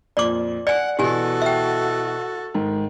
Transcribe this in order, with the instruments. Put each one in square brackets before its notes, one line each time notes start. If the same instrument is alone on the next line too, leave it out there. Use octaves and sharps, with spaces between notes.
[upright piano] F2 A#2 F#7 [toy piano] D5 D6
[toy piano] D5 G#5 [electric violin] F#5 [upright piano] C#7
[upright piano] B2 E3 [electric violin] F#4 A4 [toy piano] G4 G#5
[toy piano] E5 G5
[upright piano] G#2 D#3